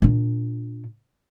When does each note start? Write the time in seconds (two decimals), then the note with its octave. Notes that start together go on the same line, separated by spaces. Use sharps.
0.02 A#2 D4